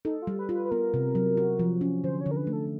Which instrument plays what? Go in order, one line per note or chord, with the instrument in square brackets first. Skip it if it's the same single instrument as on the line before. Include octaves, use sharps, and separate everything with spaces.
[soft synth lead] D#4 [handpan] A4
[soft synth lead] F4
[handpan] G3
[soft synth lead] B4
[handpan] F4
[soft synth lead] B4
B4
[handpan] B3 [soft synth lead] A#4
[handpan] C3
F#3
F#4
F3
C#4
[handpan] D3 [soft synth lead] C5
[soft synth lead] C#5
[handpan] D3
[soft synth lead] A#4
B4
[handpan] A3
[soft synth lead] A4